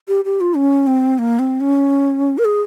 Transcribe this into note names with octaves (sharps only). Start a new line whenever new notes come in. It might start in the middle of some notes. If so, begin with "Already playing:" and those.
G4
G4
F4
C#4
C4
A#3
C4
C#4
A#4
G#4